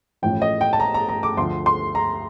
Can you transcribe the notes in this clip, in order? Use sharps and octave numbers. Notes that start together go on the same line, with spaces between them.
A1 A2 F3 G5
D#5
G5
A5
A#5
A#5
A#5
D6
D2 D3 F3 C6
C6
A#5